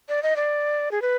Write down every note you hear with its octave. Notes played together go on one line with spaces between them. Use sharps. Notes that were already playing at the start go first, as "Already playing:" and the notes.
D5
D#5
D5
G#4
B4